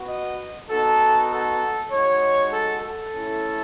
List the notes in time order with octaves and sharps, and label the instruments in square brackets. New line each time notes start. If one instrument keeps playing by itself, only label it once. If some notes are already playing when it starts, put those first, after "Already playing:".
Already playing: [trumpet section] B3 F#4
D#5
B3 D#4 F#4 A4
A4
G#3 D#4 F#4 C#5
A4
A4
A3 C#4 E4